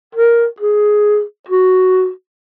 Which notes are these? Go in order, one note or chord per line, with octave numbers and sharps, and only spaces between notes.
A#4
G#4
F#4